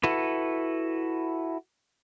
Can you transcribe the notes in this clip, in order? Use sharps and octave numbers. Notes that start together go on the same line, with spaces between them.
E4 F#4 A4 B4